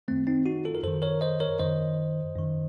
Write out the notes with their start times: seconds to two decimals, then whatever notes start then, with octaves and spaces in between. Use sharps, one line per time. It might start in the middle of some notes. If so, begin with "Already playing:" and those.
0.08 F#2 D#3 A3 C4
0.27 C4 D#4
0.46 D#4 F#4
0.65 F4 A4
0.75 A#4
0.83 F#2 D#3 A4 C5
1.02 A#4 C#5
1.21 C5 D#5
1.40 A#4 C#5
1.59 F#2 D#3 C5 D#5
2.35 F#2 D#3